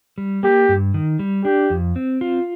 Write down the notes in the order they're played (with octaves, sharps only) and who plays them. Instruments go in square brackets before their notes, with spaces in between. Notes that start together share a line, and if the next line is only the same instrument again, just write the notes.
[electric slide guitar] G3
[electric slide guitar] A#3 [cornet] G4
[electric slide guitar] G2
D#3
G3
[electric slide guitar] D4 [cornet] G4
[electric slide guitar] F2
C4
F4